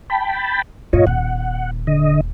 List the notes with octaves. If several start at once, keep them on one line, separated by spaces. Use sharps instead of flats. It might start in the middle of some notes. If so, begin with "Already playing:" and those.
G5 A5 B5
G2 A#2 F4 C#5 D#5
D#1 F#5
D3 D#5